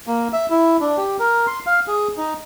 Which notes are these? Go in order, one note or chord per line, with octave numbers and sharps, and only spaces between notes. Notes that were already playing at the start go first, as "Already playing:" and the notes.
A#3
E5
E4
D4
G4
A#4
C6
F5
G#4
D#4